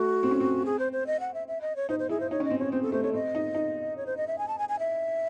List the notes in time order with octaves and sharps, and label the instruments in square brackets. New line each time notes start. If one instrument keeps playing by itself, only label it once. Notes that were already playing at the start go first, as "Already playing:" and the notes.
Already playing: [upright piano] A3 [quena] F#4
[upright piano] C4
C#4
C4
[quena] G#4
C5
C5
D#5
F#5
E5
E5
D#5
C#5
[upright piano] D#4 [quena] C5
[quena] C5
[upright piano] E4 [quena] G#4
[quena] C5
[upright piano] D#4 [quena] C#5
[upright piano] C#4 [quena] D#5
[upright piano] C4
[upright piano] C#4 [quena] C#5
[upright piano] C4 [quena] C5
[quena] A4
[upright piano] A3 [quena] C5
[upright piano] A3 [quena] C#5
[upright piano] C4 [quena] D#5
[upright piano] D#4
D#4
[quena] C#5
C5
D#5
E5
G#5
A5
G#5
G#5
E5